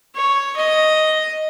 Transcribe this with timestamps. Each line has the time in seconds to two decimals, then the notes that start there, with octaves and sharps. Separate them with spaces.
0.15 C#5
0.56 D#5